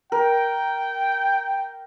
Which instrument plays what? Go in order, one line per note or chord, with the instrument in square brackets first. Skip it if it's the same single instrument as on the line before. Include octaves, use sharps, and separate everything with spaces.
[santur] A#4 [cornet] G5